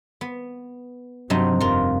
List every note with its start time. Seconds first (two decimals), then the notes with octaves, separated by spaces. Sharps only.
0.21 B3
1.30 G2 C3 F#3 D#4
1.61 F1 F4 A#4